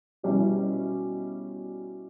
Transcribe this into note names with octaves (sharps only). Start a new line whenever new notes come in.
B2 G3 C#4 E4